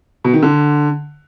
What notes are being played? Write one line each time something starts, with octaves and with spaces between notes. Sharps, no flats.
B2
D#3
D3